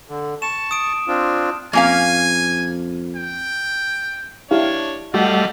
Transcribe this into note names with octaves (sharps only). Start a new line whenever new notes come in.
D3
A5 C#6 E7
D#6 D7
C4 D4 F4
F2 A#3 C#4 F5 G#5
G5
D4 E4 G4 C#5 F5
G3 A3 F#4 D#5 F5 F#5